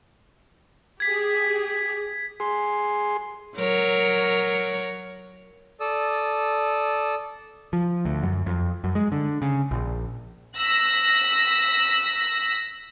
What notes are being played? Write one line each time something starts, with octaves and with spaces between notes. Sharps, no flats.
G4 G#4 G#6 B6
G#4 C6
F#3 A#4 C#5
A4 D5 D#6 E6
F3
D2
F#2
F2
F#2
G#3
D3
C#3
A#1
E6 F#6 A#6 B6